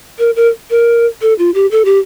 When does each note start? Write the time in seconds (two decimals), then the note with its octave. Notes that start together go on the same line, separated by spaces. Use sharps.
0.19 A#4
0.36 A#4
0.70 A#4
1.22 A4
1.39 F4
1.54 G4
1.71 A4
1.85 G4